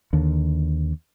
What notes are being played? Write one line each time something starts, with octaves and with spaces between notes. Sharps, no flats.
D#2 D3